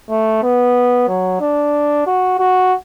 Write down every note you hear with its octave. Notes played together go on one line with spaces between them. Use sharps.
A3
B3
F#3
D4
F#4
F#4